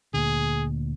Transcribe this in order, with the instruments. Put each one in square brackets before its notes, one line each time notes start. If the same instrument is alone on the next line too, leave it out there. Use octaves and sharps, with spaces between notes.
[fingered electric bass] D2 A#2 D3 [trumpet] G#4